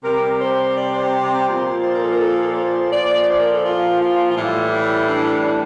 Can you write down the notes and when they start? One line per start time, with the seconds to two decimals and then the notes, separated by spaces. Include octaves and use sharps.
0.04 C3 G3 A#4
0.40 C5
0.76 D5
0.94 C5
1.48 A#2 F3
1.83 C5
1.92 A#4
2.02 A4
2.10 A#4
2.20 A4
2.55 C5
2.92 A#2 F3 D5
3.28 C5
3.40 A#4
3.53 A4
3.64 F4
4.00 F4
4.31 F4
4.36 A2 E3 G3 E4
5.09 D4
5.44 D4